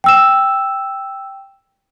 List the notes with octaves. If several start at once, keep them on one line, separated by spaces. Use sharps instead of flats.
G5 E6 E7